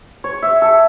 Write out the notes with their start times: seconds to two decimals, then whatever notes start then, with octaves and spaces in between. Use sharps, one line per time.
0.24 C#5
0.42 E5
0.62 A4